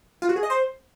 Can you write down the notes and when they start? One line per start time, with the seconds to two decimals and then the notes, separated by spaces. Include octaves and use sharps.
0.22 F4
0.29 F#4
0.36 G#4
0.43 D#5
0.50 C5